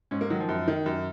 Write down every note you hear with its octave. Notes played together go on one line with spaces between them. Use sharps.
G#2 C#4
A#3
D#3 F#3
F3
F#2
D#3
F#2